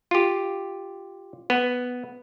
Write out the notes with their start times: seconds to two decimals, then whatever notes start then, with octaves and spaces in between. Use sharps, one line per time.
0.11 F4 G4
1.50 B3